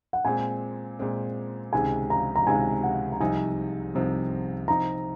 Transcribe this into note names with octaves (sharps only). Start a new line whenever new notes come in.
F#5
A#2 G#3 C4 G#5
A#2 G#3 C4
C#2 C3 D#3 G#3 G#5
A#5
A#5
C#2 C3 D#3 G#3 G#5
F#5
A#5
C2 C3 F3 C4 D#4 G#5
C2 C3 F3 C4 D#4
C3 F3 C4 D#4 A#5